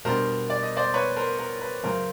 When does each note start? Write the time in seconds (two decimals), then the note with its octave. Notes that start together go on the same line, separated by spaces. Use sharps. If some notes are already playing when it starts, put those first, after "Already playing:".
0.05 B2 G3 B3 D4 A#4 C5
0.50 D5
0.63 D#5
0.77 C5 D5
0.94 B4 C#5
1.16 A#4 C5
1.39 A#4
1.62 B4
1.83 F#2 C#3 F#3 A#4 C5